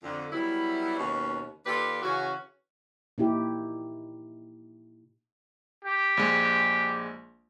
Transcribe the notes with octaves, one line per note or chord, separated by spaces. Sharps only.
F2 D3
F#3 G3 B3 E4
D#2 B2 C#4
D#2 F4 G4 A4 B4 D5
C#3 E3 C#4 F#4
A#2 D#4 E4 G4
G4
A#1 G#3